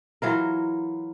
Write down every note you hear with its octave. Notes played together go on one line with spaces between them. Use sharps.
E3 F#3 F4 A#4